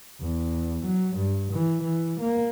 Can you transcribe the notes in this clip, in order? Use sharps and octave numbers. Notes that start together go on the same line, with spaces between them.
E2
F#3
G2
E3
E3
A#3